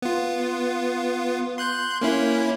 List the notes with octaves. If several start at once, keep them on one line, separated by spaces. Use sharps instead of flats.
B3 F4
C6 F#6 G6
A#3 C#4 E4